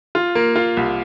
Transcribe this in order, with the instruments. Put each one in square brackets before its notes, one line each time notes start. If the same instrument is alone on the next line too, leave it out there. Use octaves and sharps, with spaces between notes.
[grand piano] F4
A#3
F4
C2